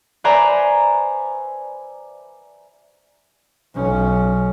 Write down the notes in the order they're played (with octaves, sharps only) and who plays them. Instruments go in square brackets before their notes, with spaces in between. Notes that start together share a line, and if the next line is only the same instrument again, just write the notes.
[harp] B4 C5 D5 E5 G#5 A#5
[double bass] B1 C#4